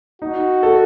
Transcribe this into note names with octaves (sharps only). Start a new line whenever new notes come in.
D#4 F#4
A4